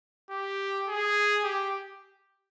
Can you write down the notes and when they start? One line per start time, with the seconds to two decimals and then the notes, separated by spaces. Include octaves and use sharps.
0.31 G4
0.87 G#4
1.44 G4